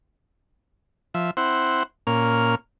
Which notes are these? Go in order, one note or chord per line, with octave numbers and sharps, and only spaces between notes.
F3 E5
C4 E4 C5 F#5
A#2 A#3 C#4 F6